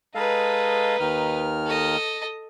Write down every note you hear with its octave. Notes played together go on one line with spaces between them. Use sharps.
G#3 D#4 A4 B4 F5
D#2 D#3 F6
A4 D#5